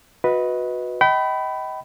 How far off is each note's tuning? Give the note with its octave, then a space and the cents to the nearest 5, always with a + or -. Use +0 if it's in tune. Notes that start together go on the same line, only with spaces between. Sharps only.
F#4 -25 B4 -5 D#5 +25
D#5 +25 G5 -35 B5 +10